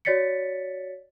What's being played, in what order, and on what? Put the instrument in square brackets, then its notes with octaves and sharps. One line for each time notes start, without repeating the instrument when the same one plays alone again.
[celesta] F#4 C#5 D5 A6 B6 C#7